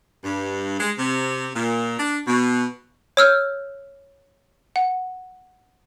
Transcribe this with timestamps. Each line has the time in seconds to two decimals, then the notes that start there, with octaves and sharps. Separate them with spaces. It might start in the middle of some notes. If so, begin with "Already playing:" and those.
0.24 G2
0.79 G#3
0.97 C3
1.54 A#2
1.98 D4
2.27 B2
3.17 C#5 E6 F6 G6
4.76 F#5